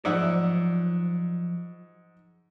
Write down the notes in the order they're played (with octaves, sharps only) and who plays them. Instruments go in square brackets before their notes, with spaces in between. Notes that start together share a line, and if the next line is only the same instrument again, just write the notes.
[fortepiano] G#2 E5 F#5 [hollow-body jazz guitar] F3 F#3 D5